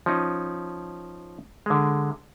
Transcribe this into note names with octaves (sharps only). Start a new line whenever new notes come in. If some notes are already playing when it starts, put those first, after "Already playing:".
F3 C#4 D#4
D3 G#3